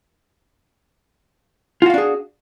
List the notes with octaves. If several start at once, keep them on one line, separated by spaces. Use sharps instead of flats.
D4 F4 F#4 G#4 F5